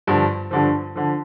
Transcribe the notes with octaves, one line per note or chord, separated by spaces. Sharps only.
G2 D3 F3
G2 D3 F3
D3 F3